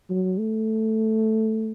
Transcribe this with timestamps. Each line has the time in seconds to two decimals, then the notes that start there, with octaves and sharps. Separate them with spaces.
0.10 F#3
0.39 A3